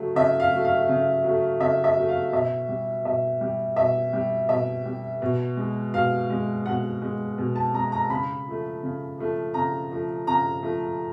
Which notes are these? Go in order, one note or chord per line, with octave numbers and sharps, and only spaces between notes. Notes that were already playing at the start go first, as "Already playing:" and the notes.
Already playing: C#3 F#3 A3
C#3 E5
F5
F#3 A3
F5
C#3
F#3 A3
C#3 E5
E5
F#3 A3
F5
B2 E5
G3
B2 E5
G3
B2 E5
G3
B2 E5
G3
B2
G#3
B2 F5
G#3
B2 F#5
G#3
B2
A5
G#3 A#5
A#5
C#3 B5
F3 A3
C#3
F3 A3
C#3 A#5
F3 A3
C#3 A#5
F3 A3